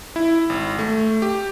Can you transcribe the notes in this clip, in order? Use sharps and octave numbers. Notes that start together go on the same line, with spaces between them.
E4
G#1
A3
G4